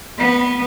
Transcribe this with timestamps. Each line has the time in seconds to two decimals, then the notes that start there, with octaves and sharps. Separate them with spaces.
0.18 B3